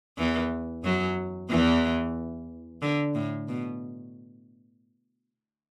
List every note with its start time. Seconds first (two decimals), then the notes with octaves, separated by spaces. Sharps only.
0.18 E2 E3
0.84 F#2 F#3
1.50 E2 E3
2.82 D3
3.15 A2
3.49 B2